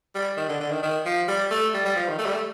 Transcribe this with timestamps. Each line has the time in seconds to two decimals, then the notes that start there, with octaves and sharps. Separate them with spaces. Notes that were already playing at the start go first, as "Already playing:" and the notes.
0.15 G3
0.37 D#3
0.49 D3
0.60 D3
0.71 D#3
0.83 D#3
1.05 F3
1.28 G3
1.51 A3
1.74 G3
1.85 G3
1.96 F3
2.07 D#3
2.19 A3
2.26 G3
2.34 A3